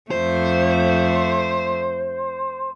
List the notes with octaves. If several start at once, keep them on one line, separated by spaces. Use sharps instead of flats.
F2 A3 C5